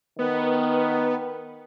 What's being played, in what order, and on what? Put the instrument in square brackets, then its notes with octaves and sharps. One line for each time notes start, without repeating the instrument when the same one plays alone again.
[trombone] D#3 [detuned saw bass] B3